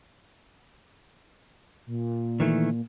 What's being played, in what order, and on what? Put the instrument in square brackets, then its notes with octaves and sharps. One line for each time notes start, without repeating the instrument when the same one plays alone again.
[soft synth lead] A#2
[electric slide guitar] D#3 E3 A3